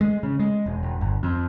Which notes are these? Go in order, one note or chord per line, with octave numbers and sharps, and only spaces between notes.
G#3
C#3
G#3
E1
E1
G1
F2